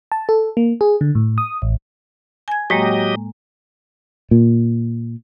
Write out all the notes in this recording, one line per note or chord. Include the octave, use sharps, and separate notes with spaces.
A5
A4
A#3
G#4
D3
A2
D#6
A1
G#5 G#6
A2 F#3 G#3 A#3 G4 D#5
A#2